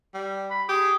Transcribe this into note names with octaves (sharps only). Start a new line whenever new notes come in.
G3
B5
G4 G#4